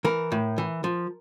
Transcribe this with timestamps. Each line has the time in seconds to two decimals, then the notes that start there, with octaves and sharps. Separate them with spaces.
0.04 E3 A#4
0.32 A2
0.58 E3
0.84 F3